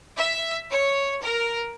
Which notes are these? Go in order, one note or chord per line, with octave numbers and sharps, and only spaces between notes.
E5
C#5
A#4